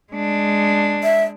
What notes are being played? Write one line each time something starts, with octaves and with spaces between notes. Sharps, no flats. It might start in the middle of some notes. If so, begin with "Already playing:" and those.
G#3 D4
E5